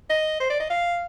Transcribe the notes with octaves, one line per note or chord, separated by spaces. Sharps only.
D#5
C5
D5
D#5
F5